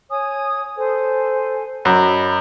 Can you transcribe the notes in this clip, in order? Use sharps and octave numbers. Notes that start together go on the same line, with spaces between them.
C#5 G#5 D#6
A4 C5 G#5
F#2 D#5 B5